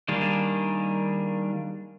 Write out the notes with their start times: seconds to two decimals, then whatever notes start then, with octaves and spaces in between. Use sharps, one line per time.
0.08 D#3 G3 A#3 D4 G#4